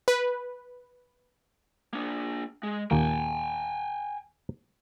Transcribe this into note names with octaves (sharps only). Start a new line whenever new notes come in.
B4
A#3 D4
G#3
D#2 A#2 A#3 G5 G#5